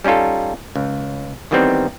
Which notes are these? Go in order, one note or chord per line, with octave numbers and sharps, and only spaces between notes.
G3 C#4 D#4 F4 A4
C#2
D#3 E3 G3 B3 C4 D#4